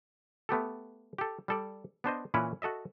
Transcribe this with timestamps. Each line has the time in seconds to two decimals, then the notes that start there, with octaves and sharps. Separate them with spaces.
0.49 A3 B3 G4 A4
1.18 G4 A4
1.48 G3 A4 D5
2.04 B3 D4 C5 D#5
2.34 A#2 E3 C#4 E4 B4 C#5
2.62 F#4 A4 D#5 E5